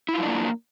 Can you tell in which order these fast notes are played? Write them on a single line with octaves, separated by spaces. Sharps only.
E4 F4 F#3 D4 A#3